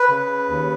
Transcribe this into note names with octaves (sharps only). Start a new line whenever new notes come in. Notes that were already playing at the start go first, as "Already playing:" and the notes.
Already playing: B4
C#3
D#2